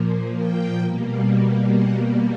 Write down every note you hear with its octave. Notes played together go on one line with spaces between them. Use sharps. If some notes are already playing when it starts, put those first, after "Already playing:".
Already playing: A#2 F3 A#3
G5
B2 G3 A#3
F#5